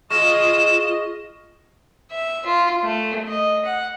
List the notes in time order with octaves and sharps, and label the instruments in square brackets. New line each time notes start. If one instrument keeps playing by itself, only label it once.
[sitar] G#3 [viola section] F4 D#5 [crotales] C#6 F6 A#6 [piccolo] E7
[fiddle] E5
F4
A3
D#5
F#5